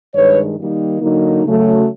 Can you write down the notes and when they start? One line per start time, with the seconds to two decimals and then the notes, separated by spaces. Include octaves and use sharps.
0.15 G2 D#3 G#3 B4 C#5
0.58 D#3 G3 A#3 D#4
1.01 D3 F#3 A#3 D#4
1.44 C#3 F#3 A3